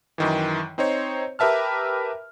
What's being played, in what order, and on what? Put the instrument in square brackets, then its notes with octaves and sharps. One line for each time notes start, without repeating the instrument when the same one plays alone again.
[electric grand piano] F#2 D#3 E3
C4 D#4 C5 C#5
G4 A#4 B4 E5 A5 F6